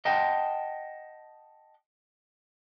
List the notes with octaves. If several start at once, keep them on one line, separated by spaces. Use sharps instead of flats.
D#5 F#5 G5 A5